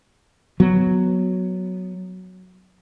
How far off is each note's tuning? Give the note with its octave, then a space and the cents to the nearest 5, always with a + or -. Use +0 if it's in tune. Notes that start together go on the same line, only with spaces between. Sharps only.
F#3 +0 B3 +0